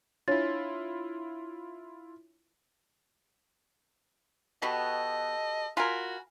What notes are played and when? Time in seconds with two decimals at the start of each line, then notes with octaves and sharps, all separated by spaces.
0.28 D4 E4 F4 C#5 A6
4.62 B2 B3 F#4 G4 A4 D#5
5.77 F4 F#4 A#4 F5 G#5 B5